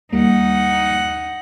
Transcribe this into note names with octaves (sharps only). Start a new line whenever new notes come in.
D#2 G3 A#3 D#4 F#5